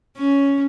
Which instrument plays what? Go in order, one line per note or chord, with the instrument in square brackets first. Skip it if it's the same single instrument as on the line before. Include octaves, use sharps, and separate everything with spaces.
[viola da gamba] C#4